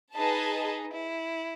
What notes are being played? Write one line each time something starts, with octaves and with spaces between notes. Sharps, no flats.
D#4 G#4 B4 D#5 A5
E4